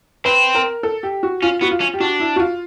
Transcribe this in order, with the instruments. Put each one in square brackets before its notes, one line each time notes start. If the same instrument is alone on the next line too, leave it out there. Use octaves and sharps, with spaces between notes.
[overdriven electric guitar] C4 [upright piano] B4
[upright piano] A#4
A4
G4
F#4
[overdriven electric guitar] C#4 [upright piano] F4
[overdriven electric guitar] B3 [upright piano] F#4
[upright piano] F4
[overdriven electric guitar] C#4
[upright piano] G4
[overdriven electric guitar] D4 [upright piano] F#4
[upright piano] E4
F#4
F4